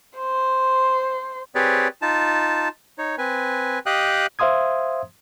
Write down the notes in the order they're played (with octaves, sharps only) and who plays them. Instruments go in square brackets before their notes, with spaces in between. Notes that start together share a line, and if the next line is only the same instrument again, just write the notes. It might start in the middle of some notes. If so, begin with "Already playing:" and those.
[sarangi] C5
[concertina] C4 G4 G#4 B4 C#5 D5
D#4 F4 A5
D#4 C#5
C4 B4 G#5
G4 D#5 F5 G5 D#6 F#6
[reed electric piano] C5 E5 F5 C6 D#6 G#6